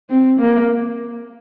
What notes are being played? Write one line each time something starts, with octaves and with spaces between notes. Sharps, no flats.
C4
A#3